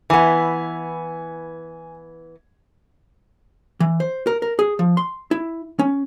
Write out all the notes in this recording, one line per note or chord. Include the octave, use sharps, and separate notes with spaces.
E3 B3 G#5
E3
C5
A#4
A#4
G#4
F3
C6
E4
C#4